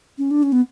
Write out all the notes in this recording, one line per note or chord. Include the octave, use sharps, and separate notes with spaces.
C#4
D4
C#4
B3